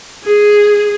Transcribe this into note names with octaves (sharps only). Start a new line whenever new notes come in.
G#4